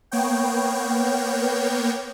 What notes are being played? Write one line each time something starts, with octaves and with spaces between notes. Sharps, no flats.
A#3 B3 C#5 G5